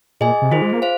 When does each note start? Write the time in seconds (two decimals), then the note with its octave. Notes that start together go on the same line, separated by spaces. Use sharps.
0.20 A#2 G#4 D#5 G#5
0.42 C3
0.51 D#3 F4 G#4 C5
0.62 G#3
0.72 A#3
0.82 C5 F5